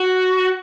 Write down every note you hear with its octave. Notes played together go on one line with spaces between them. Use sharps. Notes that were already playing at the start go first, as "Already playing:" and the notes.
Already playing: F#4